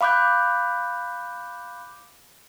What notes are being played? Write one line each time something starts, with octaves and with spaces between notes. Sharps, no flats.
F5 B5 D6 F#6 G6